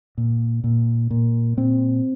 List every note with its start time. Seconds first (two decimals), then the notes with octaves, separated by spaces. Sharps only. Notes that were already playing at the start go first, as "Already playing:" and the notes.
0.18 A#2
0.64 A#2
1.10 A#2
1.57 A#2 C4